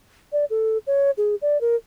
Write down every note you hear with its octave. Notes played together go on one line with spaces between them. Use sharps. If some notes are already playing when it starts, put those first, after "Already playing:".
D5
A4
C#5
G#4
D5
A#4